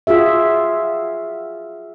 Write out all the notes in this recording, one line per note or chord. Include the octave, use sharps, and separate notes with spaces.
F4 F#4 G#4 E5